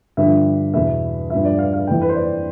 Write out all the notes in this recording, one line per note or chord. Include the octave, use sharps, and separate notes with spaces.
G2 D3 F3 E5
E2 B2 E5
G2 F3 E5
D5
F5
F5
F2 E3 G5
B4
C5
D5